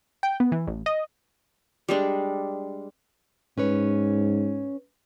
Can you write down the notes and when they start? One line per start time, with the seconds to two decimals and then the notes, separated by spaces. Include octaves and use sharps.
0.23 G5
0.40 B3
0.52 E3
0.67 A1
0.86 D#5
1.89 G3 G#3 D4
3.58 G#2 C#4 B4 C#5